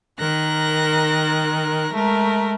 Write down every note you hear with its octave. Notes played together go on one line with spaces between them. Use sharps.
D#3 A#4 F#6 A#6
G#3 A3 A#4